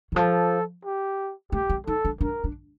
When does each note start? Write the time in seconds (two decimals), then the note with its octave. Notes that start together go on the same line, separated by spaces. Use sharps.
0.12 D#3
0.16 F3 A4
0.85 G4
1.52 A3 G4
1.70 C4
1.87 D#4 A4
2.05 D4
2.21 D4 A#4
2.44 D4